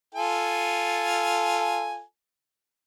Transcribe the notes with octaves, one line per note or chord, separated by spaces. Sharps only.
F4 A4 G#5